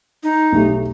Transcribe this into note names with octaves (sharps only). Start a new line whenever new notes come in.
D#4
B1 A3 G4